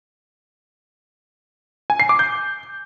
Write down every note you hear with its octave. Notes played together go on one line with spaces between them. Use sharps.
G#5
C7
D6
G6